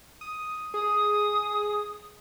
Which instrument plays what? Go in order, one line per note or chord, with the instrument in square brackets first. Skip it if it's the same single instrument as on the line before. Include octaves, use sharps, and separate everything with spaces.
[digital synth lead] D#6
[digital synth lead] G#4 [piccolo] D#6